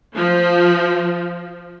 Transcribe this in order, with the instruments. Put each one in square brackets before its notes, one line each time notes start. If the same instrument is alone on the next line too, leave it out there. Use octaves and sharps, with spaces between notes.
[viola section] F3